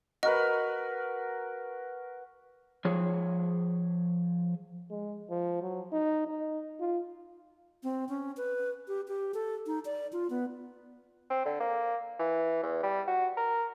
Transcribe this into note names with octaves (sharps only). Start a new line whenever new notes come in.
F#4 A#4 B4 D#5
F3 G#4 C#5
G#3
F3
F#3
D#4
D#4
F4
C4
C#4
B4
G4
G4
A4
D#4
D5
F4
B3
C4
D3
A#3
E3
E2
G3
F#4
A#4